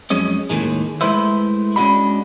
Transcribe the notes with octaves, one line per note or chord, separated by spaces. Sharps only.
F2 F#3 G#3 C#4 D#5
D#2 A2 D#3 G#3
G#3 A3 E4 B4 C5 E5
G#3 C#4 D4 F#4 D#5 B5